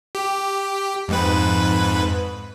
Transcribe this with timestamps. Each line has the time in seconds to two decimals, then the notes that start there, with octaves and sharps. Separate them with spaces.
0.15 G4
1.08 F2 G#2 B4